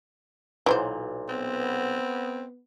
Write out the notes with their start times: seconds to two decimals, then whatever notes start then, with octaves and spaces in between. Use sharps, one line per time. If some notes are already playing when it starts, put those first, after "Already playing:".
0.66 B1 A#2 E3 F#3 C5
1.29 B3 C4